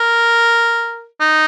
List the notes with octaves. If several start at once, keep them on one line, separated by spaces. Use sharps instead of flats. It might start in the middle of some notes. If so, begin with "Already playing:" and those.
Already playing: A#4
D#4